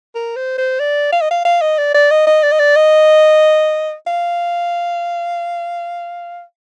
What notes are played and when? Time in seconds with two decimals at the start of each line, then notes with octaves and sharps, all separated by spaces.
0.15 A#4
0.36 C5
0.58 C5
0.80 D5
1.12 F5
1.21 D#5
1.31 F5
1.45 F5
1.61 D#5
1.78 D5
1.95 D5
2.11 D#5
2.27 D#5
2.43 D5
2.52 D#5
2.59 D5
2.76 D#5
4.07 F5